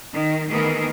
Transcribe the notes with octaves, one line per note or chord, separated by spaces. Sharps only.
D#3
D#3 E3 A3 B3 G#4 A#4